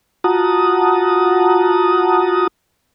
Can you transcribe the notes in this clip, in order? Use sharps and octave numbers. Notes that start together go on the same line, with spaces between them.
F4 F#4 F#5 A5 A#5 D#6